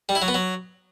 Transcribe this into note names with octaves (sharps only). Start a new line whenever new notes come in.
G3
E4
F#3
B3
F#3